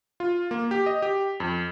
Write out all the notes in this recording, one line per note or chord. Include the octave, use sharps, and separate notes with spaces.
F4
A#3
G4
D#5
G4
F2